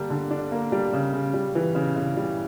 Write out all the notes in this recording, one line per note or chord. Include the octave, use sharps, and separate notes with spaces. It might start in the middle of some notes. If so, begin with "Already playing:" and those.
Already playing: D3 G3 A#3 D4
D3
D4
A#3
G3
C#3
C#3
G3
E3
C#3
C#3
G3